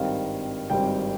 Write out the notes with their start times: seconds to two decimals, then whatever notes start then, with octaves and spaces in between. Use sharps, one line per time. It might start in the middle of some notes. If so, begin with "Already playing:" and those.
Already playing: G#1 G2 D#3 G3 C4 F5
0.70 G#1 G2 D#3 G3 C4 G5